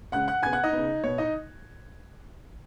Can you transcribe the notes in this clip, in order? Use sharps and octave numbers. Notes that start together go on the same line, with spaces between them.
C#3 G#3 C#4 F#5 F#6
F#5 F#6
C#3 B3 G#5 G#6
F#5 F#6
D#4 D#5
C#3 B3
B2 B3 C#5
D#4 D#5